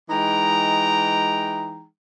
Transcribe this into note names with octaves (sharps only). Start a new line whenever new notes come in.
E3 G#3 D#4 G5 A#5